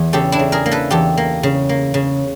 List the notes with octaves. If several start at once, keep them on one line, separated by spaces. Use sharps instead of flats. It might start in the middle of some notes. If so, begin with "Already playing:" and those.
Already playing: E2
C#3 G4 A4
D4 E4
C#3
G#4 A#4
A#3
A4 B4
E2 G4 A4
A#3
C#3
A#3
C#3